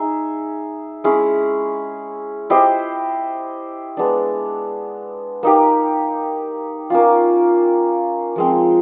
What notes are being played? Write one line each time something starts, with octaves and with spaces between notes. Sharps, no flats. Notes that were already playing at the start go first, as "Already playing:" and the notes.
Already playing: D#4 G#4 E5
G#3 C#4 E4 G#4
E4 G4 C5 D#5
G#3 B3 D4
A#3 D#4 G4
A#3 C#4 F4
F3 G#3 C4